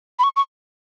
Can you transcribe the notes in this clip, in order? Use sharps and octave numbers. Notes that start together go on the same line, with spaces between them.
B5
C#6
C#6